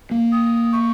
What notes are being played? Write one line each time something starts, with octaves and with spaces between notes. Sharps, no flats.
A#3
D#6
C#6